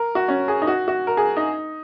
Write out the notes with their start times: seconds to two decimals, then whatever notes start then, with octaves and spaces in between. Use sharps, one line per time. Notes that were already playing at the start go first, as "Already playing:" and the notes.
Already playing: A#4
0.15 F#4
0.28 C#4
0.48 G#4
0.62 D#4
0.67 F#4
0.88 F#4
1.07 A#4
1.17 G#4
1.37 D#4